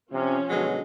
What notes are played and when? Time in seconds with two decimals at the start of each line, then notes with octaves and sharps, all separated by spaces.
0.12 C3 F3 C#4
0.49 B2 D3 F#3 G#3